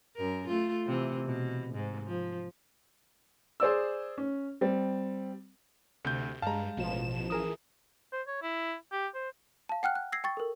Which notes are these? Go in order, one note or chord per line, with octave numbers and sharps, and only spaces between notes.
F#2 A#4
A3 F4
C3 E3
B2
G#2
F3
G#4 C5 D5 E6
C#4
G3 C4
D2 C3 G6
G2 G#3 F5 A5 A#5
A1 B2 F3 E7
E3 G#4 A#4 D#6
C5
C#5
E4
G4
C5
F5 A5
F#5 G5 F6 F#6
F#6
E6 G#6 A#6 C7
G5 C#6 A6
A4 A#4